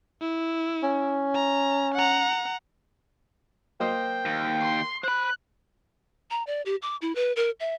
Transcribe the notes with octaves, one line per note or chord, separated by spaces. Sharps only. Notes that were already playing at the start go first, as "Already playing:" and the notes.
E4
C#4
A#5
F#5 A#5
A#3 C5 D#5 G5
D#2
C6
C5 B5 F#6
A#5
D5
G4
D6
E4
B4
A#4
E5